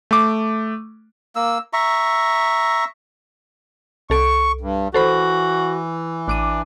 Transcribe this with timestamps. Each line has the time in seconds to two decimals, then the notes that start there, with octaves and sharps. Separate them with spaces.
0.11 A3 D6
1.36 A#3 E6
1.73 E5 A#5 C#6
4.10 C2 A4 C#6 D7
4.61 G2
4.94 E3 F#4 A4 C5 B5
6.28 A1 D4 D6 D#7